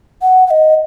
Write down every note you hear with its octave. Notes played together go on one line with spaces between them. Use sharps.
F#5
F#5
D#5